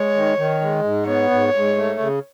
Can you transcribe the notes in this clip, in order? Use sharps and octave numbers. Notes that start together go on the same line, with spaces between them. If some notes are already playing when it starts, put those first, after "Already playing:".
Already playing: G#3 C#5
D#3
D#3
G#3
G#2
B3 C#5
G#2
G#2
A3
C#3